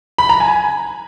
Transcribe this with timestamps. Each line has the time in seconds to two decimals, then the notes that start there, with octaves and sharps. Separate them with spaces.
0.18 B5
0.29 A#5
0.40 G#5